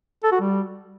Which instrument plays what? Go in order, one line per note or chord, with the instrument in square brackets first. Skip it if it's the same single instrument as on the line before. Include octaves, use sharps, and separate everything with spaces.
[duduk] A4
F#4
G3